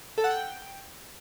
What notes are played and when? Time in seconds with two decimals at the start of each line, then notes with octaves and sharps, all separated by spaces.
0.18 A4
0.24 F#5
0.30 G5